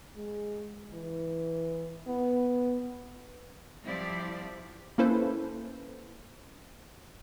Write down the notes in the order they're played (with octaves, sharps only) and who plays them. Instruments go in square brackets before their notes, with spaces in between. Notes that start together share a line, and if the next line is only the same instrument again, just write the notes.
[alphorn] G#3
E3
B3
[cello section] F3 G3 C4 E4 G4 D5
[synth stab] A#3 C#4 E4 A4 B4 C5